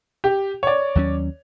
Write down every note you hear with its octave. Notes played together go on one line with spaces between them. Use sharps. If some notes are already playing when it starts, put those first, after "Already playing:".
G4
C#5 D5
D#2 F#3 C#4